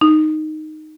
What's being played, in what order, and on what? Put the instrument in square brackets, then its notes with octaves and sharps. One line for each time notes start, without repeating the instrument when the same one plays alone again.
[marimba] D#4